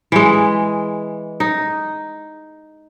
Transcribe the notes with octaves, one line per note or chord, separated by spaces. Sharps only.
E3 G#3
D#4